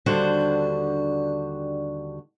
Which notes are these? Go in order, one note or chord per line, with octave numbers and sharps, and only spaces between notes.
D#2 D3 G3 D4 F#4 C5